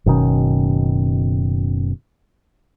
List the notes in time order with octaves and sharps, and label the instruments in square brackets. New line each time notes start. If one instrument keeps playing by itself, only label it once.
[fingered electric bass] F#1 B2 D#3 C#4